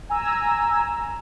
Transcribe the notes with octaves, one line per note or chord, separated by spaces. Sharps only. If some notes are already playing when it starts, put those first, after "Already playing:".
G#5 A#5 E6